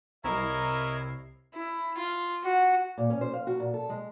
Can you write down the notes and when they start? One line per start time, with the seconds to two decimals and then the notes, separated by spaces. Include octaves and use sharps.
0.24 C2 E4 A#4 C#5 D#5 E5 A#5 C7
1.54 E4
1.98 F4
2.44 F#4
2.98 A#2
3.10 C#4
3.21 C5
3.34 F5
3.47 F#4
3.60 A#2
3.74 A4
3.90 G#3